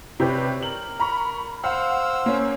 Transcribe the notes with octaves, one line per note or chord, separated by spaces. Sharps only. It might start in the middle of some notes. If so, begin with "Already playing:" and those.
C3 G4 B4 C#5 D5
A#4 F#7
A#5 B5 C#6
C5 F5 F#5 E6 F6
A#3 C#4